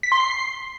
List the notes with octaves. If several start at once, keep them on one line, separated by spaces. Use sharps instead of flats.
B6
C6
C7